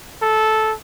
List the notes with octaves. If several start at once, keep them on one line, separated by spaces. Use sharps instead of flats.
A4